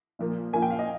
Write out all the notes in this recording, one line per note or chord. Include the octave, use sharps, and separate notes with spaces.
A#2 F3 A#3
A#2 F3 A#3 G#5
G5
F5
D#5